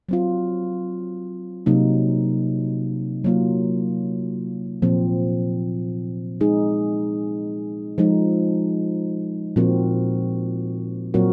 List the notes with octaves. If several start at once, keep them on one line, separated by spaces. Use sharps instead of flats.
F#3 C4 F4
C3 F#3 A#3 D#4
F#3 A#3 F4
A#2 F3 C4
G#3 D#4 G#4
F3 G#3 D#4
A#2 F3 C4 F#4 A#4
A#2 F#3 C4 F#4 A#4